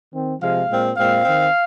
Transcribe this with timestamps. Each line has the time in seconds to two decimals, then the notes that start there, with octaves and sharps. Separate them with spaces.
0.12 D#3 C4
0.41 C3 F3 G#3 F5
0.69 A#2 G#3 C4
0.97 A#2 G#3 C4 F5
1.25 D#3 C4